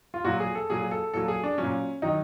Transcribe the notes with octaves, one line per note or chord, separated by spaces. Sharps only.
F4
A#2 F#3 F#4
G#4
A4
A#2 F#3 G#4
A4
A#2 F#3 A4
G#4
D4
A#2 F#3 C#4
D#3 F#3 D#4